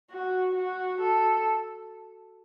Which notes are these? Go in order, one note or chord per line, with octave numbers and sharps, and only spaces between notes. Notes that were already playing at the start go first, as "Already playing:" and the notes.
F#4
F#4
A4